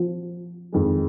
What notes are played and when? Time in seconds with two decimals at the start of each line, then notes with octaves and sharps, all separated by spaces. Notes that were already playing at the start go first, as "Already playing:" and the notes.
Already playing: F3
0.73 F2 D#3 G#3